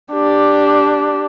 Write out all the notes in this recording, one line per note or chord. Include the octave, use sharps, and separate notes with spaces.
D4 G4